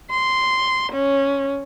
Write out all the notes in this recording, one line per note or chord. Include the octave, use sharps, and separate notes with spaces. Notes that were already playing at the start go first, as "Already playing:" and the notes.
C6
C#4